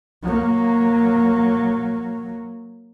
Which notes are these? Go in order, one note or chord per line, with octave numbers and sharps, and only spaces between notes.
F#3 A#3